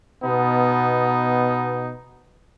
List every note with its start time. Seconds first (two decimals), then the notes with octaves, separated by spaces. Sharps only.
0.23 B2 B3 D#4